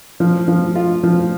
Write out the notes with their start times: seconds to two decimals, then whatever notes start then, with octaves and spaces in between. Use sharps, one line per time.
0.20 F3
0.48 F3
0.76 F4
1.03 F3